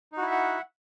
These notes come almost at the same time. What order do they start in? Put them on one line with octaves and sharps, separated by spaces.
D#4 F#4 E4 E5 F#5